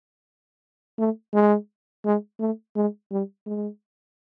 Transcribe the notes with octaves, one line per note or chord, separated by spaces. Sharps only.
A3
G#3
G#3
A3
G#3
G3
G#3